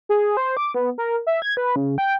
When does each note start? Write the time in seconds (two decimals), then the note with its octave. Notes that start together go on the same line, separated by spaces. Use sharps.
0.09 G#4
0.37 C5
0.57 D6
0.74 B3
0.98 A#4
1.27 E5
1.42 G#6
1.57 B4
1.76 C#3
1.98 G5